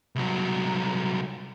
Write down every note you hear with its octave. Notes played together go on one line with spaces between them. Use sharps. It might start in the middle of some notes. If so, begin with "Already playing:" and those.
C2 F#3